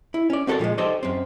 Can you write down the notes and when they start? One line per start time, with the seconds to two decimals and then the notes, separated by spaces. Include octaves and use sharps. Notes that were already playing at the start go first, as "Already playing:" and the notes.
0.14 E4
0.30 C#4 D5
0.47 C4 F#4 A4 A#4 D5
0.59 A#2 F3 F#3 G#3
0.78 D#4 G4 A4 C5 D5 D#5
1.03 F#2 C4